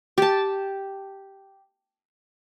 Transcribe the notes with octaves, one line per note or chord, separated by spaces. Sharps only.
G4 A5